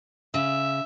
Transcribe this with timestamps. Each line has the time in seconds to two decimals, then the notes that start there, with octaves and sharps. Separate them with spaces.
0.34 C#3 E5